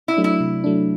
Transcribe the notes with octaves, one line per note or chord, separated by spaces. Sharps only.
E4
F#3 A3 D4
E4
C3
F#3 A3 D4